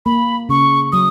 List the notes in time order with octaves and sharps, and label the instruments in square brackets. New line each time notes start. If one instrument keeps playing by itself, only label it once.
[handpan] A#3 [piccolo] B5
[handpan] C#3 [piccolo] C#6
[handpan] F#3 [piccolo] D#6